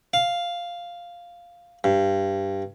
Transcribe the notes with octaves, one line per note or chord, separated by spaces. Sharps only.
F5
G2